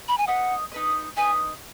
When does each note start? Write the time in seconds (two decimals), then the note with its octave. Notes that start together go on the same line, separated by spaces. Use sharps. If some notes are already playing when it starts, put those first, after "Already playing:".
0.08 B5
0.18 G#5
0.27 D#4 B4 D#5 F#5
0.72 D#4 B4 D#5
1.17 D#4 B4 D#5 G#5